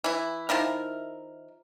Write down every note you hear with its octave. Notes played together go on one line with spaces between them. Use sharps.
E3 E4
D#3 F3 E4 A#4